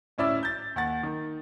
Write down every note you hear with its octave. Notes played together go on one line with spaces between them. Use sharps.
D1 C#4 E4 D5 E6
G6 A6
D#2 F#5 A6
D#3